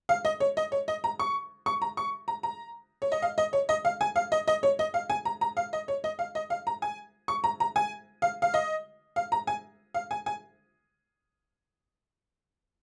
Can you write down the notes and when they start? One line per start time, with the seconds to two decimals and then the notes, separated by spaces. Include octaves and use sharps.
0.09 F5
0.25 D#5
0.40 C#5
0.57 D#5
0.72 C#5
0.88 D#5
1.04 A#5
1.19 C#6
1.66 C#6
1.82 A#5
1.97 C#6
2.28 A#5
2.43 A#5
3.02 C#5
3.12 D#5
3.22 F5
3.38 D#5
3.53 C#5
3.69 D#5
3.85 F5
4.01 G#5
4.16 F5
4.32 D#5
4.48 D#5
4.63 C#5
4.79 D#5
4.94 F5
5.10 G#5
5.25 A#5
5.41 A#5
5.57 F5
5.73 D#5
5.88 C#5
6.04 D#5
6.19 F5
6.35 D#5
6.50 F5
6.67 A#5
6.82 G#5
7.28 C#6
7.44 A#5
7.60 A#5
7.76 G#5
8.22 F5
8.42 F5
8.54 D#5
9.16 F5
9.32 A#5
9.47 G#5
9.94 F5
10.11 G#5
10.26 G#5